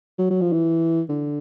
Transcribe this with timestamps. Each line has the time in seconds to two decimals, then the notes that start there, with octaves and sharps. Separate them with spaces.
0.19 F#3
0.30 F#3
0.41 F3
0.52 E3
1.09 D3